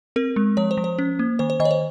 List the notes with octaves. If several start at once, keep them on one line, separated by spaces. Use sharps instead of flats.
C4 A#4
G#3
F3 C#5
C5
F3
C5
C#4
A#3
D#3 C5
C5
D#3 D#5
C#5
C5